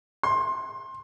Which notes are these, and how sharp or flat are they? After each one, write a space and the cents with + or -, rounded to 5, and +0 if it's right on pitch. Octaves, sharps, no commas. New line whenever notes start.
C6 +20